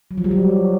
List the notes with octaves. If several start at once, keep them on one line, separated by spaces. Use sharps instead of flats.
F#3
F3
G3
F#3